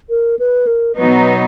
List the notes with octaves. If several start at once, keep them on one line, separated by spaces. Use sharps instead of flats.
A#4
B4
A#4
B2 F#3 B3 D#4 B4